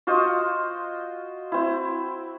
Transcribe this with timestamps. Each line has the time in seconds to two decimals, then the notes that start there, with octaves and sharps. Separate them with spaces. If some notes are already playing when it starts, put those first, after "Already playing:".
0.07 F4 F#4 C5 D#5
1.52 C4 E4